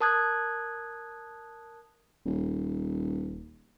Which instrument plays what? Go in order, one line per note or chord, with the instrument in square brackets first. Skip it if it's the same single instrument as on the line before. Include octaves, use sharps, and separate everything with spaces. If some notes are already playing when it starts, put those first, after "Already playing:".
[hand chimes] A#4 A5 D#6 F#6 G#6
[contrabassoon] D#1